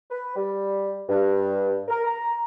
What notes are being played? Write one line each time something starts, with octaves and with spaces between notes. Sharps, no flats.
B4
G3
G2
A#4
A#5